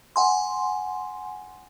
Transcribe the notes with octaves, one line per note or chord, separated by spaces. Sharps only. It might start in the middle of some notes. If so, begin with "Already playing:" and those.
F#5 G#5 C6